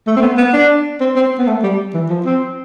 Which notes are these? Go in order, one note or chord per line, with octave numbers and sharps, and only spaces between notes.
A3
C4
B3
B3
D4
C4
C4
B3
A3
G3
E3
F3
C4